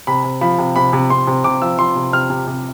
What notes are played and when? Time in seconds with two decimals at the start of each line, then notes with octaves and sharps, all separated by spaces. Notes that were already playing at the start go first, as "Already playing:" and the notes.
0.07 C3 B5
0.24 C3
0.41 F3 B5
0.58 C3
0.76 C3 B5
0.93 C3
1.10 C3 C6
1.27 C3
1.44 C3 D6
1.62 F3 E6
1.78 F3 C6
1.96 C3
2.13 C3 F6
2.30 C3
2.47 C3